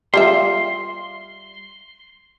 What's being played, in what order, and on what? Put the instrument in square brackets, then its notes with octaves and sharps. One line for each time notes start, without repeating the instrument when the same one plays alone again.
[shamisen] G3 F4 E5 [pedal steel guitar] C6